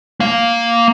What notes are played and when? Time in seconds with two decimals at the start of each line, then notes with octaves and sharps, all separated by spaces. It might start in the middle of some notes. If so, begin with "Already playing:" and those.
0.20 A#3 F5